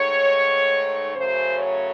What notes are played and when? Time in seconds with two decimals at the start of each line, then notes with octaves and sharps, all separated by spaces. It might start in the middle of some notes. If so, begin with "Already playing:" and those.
Already playing: G#2 D#3 A3 C#5
1.15 F#2 C#3 F#3 A3 C5
1.57 C#5